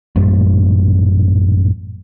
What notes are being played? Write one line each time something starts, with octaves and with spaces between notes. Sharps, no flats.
A1 F#2 A#2 G3